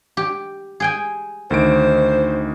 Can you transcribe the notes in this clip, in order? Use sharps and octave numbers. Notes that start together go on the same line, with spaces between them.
G4
G#4 G5 G#5
D2 D#3 C5 D7